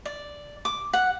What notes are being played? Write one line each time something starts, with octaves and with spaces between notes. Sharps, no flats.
D5
D6
F#5